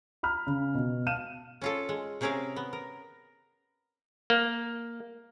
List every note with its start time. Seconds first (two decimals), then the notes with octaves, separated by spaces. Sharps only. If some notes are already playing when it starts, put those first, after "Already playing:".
0.23 A#5 B5 F6
0.47 C#3
0.75 B2
1.06 F5 A5 F6 D#7 E7
1.62 C#4 F4 A4
1.89 G#3
2.21 C3 C#4 G#4 A#4 E5 F5
2.56 B3
2.73 A#4
4.30 A#3